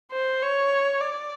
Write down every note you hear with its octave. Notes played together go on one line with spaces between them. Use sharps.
C5
C#5
D5